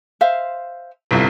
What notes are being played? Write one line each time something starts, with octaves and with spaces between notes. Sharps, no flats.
C5 E5 F5
G1 C2